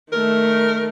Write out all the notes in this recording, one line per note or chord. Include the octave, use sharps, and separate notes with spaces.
D#3 A3 A#4